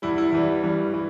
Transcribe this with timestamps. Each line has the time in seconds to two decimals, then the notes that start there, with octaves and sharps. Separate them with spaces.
0.02 E2 E3 G3 E4
0.18 E4
0.32 E2 E3 G3
0.64 G2 E3 G3
0.94 E3 G3